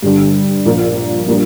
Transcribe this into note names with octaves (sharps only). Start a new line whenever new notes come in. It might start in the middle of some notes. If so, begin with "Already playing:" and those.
G2 D3 G3
A#1 A#2 A#3
A#2 G3 A#3 D4